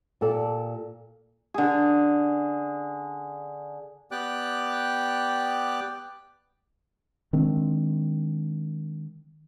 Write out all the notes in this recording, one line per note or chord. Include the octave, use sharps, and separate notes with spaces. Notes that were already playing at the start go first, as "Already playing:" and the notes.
A#2 G4 A4 D5
D3 G#4
B3 G4 D5 G5 D6 F#6
D#3 G#3 C4 D4